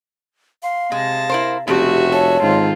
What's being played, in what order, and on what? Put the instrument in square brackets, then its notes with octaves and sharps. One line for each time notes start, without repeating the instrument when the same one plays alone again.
[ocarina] F5 [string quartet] C6
[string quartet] C3 A5 A#6 [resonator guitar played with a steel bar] G#3
[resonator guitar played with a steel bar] E4 A#4 C5
[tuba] F1 [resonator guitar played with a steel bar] C#3 A3 C4 [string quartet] F#4 E5 [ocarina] G4
[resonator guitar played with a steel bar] A4 [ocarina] C#5
[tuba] G#2 [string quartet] D#3 C4 F4